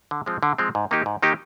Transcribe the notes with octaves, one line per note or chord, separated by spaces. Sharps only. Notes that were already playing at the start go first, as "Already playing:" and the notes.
D3
F3 G#3 C4
D3
F3 G#3 C4
G#2
D#3 A#3 D#4 G4
G#2
D#3 A#3 D#4 G4